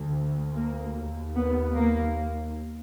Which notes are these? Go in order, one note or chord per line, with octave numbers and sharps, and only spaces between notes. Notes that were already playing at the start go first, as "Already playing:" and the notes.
Already playing: D2
A#3
D#2
B3
A#3